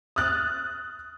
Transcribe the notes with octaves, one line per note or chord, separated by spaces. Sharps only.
D#6 F6 F#6 A6